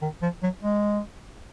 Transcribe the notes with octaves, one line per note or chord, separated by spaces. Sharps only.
D#3
F3
F#3
G#3